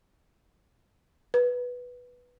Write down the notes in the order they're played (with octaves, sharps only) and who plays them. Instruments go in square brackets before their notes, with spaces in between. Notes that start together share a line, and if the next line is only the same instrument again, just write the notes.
[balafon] B4